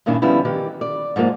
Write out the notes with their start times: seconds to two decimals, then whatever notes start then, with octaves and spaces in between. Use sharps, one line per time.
0.06 G2 A#2 D#3 C#4 D4 E4
0.22 D3 F3 G3 B3 C#4 E4
0.45 D#3 E3 G4
0.81 D5
1.16 G#2 F3 G#3 A#3